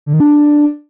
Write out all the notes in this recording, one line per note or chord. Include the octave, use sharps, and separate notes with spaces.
D3
D#3
D4